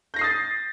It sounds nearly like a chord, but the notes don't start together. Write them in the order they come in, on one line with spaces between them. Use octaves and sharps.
G6 A#6 C7 D#6 A6